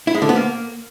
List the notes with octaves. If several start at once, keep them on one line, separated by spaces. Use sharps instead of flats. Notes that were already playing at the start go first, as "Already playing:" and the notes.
E4
G#3
D3
B3
A#3